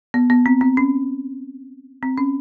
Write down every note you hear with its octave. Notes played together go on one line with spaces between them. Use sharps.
B3
B3
C4
C4
C#4
C4
C#4